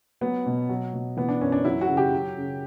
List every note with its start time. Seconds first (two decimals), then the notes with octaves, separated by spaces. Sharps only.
0.21 F#3 B3
0.46 B2
0.69 F#3
0.94 B2
1.17 E3 B3
1.29 D4
1.41 F#2 C#4
1.52 D4
1.65 F#3 E4
1.81 F#4
1.88 C#3
1.97 G4
2.13 F#3
2.37 C#3